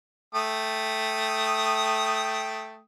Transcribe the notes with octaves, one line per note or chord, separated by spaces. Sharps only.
A3 G5 D#6